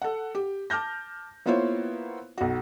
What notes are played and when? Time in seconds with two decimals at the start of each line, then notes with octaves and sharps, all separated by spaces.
0.02 A4 F#5
0.35 G4
0.70 A5 D6 F6 G6 A#6
1.46 A#3 B3 E4 F4 C5 C#5
2.38 B1 F#4